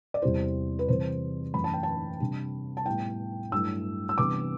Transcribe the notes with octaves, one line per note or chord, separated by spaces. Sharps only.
D5
E2 C3 G3 C4 E4 C5
B4
C3 E3 G3 C5
F#2 E3 A3 B5
A5
G5
A5
C3 G3 D4
A5
A2 G3 B3 E4 G5
G2 F#3 A3 E4 E6
E6
C3 E3 G3 B3 D4 D6